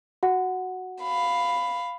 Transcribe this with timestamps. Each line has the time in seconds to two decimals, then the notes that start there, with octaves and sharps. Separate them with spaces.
0.23 F#4 F#5
1.02 F5 B5